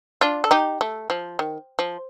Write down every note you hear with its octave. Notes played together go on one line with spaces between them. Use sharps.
D4 F4
A4
D#4 G4
A3
F3
D#3
F3